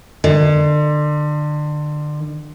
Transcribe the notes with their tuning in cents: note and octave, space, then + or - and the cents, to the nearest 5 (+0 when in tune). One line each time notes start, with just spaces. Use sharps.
D3 +30